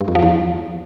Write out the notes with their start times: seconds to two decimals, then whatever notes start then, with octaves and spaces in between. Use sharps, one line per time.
0.01 G2
0.08 F2
0.15 F3
0.22 E2